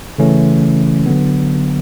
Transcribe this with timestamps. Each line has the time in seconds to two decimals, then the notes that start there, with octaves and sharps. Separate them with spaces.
0.18 C#3 E3 A3 C#4
1.06 D3 F#3 B3